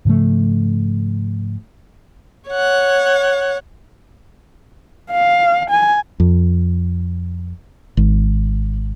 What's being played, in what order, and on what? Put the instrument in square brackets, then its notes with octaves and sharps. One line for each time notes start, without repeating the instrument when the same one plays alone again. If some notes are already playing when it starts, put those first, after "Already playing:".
[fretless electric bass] G#2 C#3 F3 A3
[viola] C#5 F#5
[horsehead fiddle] F5
G#5
[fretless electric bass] F2
G#1